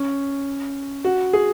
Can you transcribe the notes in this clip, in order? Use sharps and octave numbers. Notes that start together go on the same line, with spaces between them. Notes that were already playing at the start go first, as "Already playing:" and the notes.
Already playing: C#4
F#4
G#4